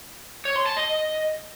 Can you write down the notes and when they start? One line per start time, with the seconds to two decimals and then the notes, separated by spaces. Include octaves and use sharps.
0.45 C#5
0.56 C6
0.66 A5
0.77 D#5